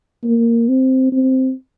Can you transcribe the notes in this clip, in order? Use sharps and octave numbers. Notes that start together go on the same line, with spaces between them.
A#3
C4
C4